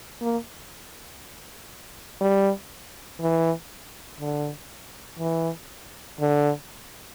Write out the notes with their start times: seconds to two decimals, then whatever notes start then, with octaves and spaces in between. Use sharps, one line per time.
0.21 A#3
2.21 G3
3.21 E3
4.21 D3
5.19 E3
6.20 D3